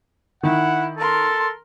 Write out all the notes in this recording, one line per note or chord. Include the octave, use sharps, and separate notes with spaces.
D#3 E4 F#5
A4 A#4 C6